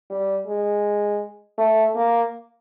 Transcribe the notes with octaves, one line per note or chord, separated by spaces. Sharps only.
G3
G#3
A3
A#3